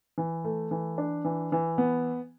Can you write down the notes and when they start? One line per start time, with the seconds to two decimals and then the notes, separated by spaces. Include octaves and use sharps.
0.18 E3
0.44 A3
0.71 E3
0.98 D4
1.25 E3
1.52 E3
1.78 B3